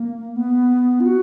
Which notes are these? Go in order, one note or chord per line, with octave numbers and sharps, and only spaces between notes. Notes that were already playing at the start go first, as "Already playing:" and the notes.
Already playing: A#3
B3
F4
F#4